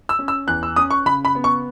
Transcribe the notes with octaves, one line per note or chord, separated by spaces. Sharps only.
E6
C#4
E6
E2 F#6
E6
C#4 D#6
C#6
C#3 B5
B5
B3
C#6